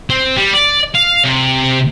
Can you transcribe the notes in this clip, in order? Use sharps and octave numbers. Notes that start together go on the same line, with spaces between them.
C4
G3
D5
F5
C3